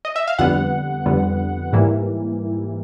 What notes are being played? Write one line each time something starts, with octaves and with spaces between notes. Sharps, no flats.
D#5
E5
F5
F2 D3 G3 B3 F#5
F2 D3 G3 B3
G#2 E3 G3 A#3